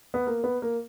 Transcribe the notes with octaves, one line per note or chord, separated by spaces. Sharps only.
B3
A#3
B3
A#3